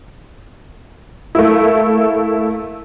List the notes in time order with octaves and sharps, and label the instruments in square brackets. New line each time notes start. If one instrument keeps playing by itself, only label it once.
[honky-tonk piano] A3 A#3 E4